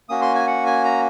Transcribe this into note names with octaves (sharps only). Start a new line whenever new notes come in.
A#3 C#4 F#4 D#6
C6
G#5
F#5
G#5
A#5